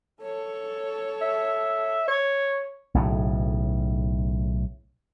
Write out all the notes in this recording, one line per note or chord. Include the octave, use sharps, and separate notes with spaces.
A4 C#5
E5
C#5
B1 A2 C#3